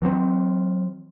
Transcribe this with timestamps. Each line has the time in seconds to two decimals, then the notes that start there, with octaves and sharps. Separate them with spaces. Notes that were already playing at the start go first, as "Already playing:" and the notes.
0.02 E3 F#3 G#3 C4